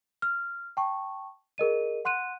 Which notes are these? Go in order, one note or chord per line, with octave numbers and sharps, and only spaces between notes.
F6
G5 A5 C#6
G#4 A#4 D#5 D#7
F#5 C6 F#6 D#7